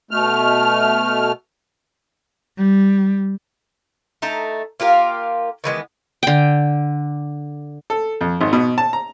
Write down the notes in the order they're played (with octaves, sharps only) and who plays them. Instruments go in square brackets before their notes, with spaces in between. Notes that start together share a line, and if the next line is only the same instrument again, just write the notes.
[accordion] B2 A3 F6
[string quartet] G3
[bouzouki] A3 D#4 A5 A#5
A#3 F4 G4 A#4
D#3 E3 G#3 B3
[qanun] D3 G5
[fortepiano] A4
F2
G#1
B2
A5
A#5